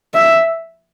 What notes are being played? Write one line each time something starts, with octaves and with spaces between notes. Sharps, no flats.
E5